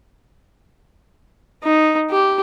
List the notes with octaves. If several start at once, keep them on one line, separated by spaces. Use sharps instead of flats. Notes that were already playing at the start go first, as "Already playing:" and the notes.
D#4
G4